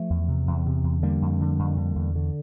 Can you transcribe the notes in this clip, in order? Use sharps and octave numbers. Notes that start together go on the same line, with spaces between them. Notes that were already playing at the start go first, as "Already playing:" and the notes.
Already playing: F3 A3
E2
C3
E2
C3
E2
D3 G3 A#3
F2
D3
F2
D3
E2
D3